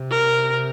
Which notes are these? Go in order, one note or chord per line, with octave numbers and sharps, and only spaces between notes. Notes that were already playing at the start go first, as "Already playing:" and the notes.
Already playing: C3
A#4